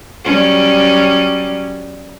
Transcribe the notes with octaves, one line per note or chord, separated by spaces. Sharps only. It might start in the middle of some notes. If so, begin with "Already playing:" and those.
F#3 G3 C#4